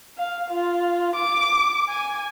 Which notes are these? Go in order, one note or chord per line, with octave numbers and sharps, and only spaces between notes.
F5
F4
D6
G#5